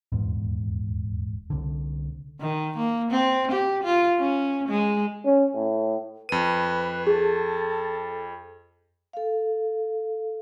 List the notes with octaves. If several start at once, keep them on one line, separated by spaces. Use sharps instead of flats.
D#1 E2 G#2
C2 D3
D#3
A#3
C4
G4
F4
C#4
G#3
C#4
A2
F2 B4 D#7
G#4 A4
A4 F5